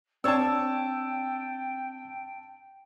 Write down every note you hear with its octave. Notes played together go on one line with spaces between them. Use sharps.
C4 D4 C#5 D5 G5 A5 E6